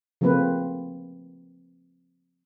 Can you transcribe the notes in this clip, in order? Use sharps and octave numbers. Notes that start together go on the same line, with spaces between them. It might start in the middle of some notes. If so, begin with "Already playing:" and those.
C#3 F3 A3 A#3 C4 B4